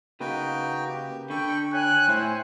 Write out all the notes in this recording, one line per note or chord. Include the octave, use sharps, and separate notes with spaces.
C#3 A#3 D#4 F#4 B4 G5
G4
D3 A4 G5 B5 C#6
C#5 E5 G5 G#5 F#6
A2 E4 C5